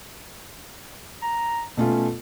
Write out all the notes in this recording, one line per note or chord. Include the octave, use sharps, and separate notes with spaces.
A#5
B2 A3 C#4 F4